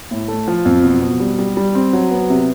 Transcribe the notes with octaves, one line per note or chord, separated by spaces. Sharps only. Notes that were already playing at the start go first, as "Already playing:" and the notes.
A2
A3
F3
F2
B2
B2
G3
G3
G3
C4
F#3
B3
C3